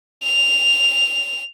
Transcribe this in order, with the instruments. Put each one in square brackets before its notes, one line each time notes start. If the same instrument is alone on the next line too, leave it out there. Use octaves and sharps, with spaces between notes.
[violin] F7